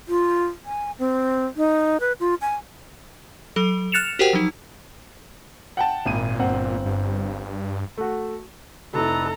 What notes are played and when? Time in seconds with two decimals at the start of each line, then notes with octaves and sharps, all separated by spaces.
0.08 F4
0.65 G#5
0.99 C4
1.57 D#4
2.00 B4
2.20 F4
2.41 G#5
3.56 F#3 A4
3.92 F6 F#6 A6 C#7 E7 F7
4.19 F#4 G4 A#4 C5 F#5 G5
4.33 F3 F#3 D#4
5.77 F#5 G5 A5
6.06 G#1 A#2 D#7
6.39 G1 C4 F#5
6.86 G2
7.98 A3 F#4
8.94 F1 C4 E4 A4 B4 D5 A#5